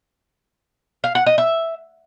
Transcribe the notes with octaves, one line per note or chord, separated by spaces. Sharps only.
F5
F#5
D#5
E5